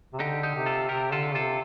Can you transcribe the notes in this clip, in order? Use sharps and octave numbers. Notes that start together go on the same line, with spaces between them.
C3
D3 D#4 G4
D#4 G4
C3
F4 A4
C3 G4 A#4
D3 F4 A4
C3 F4 A4